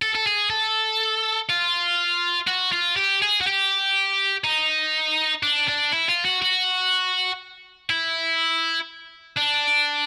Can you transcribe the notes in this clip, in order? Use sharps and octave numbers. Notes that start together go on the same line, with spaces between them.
A4
A4
G#4
A4
F4
F#4
F4
G4
G#4
F#4
G4
D#4
D4
D4
E4
F4
F#4
F#4
E4
D4